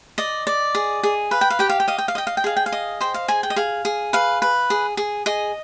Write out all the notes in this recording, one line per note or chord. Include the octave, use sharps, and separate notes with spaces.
D5 D#5
D5
G#4
G#4
B4 F5
G5
F5
G4 G5
F5
G5
D#5 F5
G5
F5
D#5 G5
F5
G5
G#4 F5
G5
F5
D#5
C5 G5
F5
G#4 G#5
G5
D#5
G#4 F5
G#4
B4 F5
B4
G#4
G#4
G#4 D#5